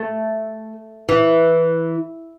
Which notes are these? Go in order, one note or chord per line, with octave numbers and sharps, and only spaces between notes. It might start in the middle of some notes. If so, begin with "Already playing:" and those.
Already playing: A3
E3